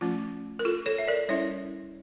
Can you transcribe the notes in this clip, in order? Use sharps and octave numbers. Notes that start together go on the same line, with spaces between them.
F3 A3 C#4 F4
A#4
F4 A4
A4 C#5
E5
A#4 D5
G3 C#4 E4 C#5 E5